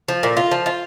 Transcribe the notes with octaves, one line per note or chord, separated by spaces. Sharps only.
F3
A#2
F4
F3
F4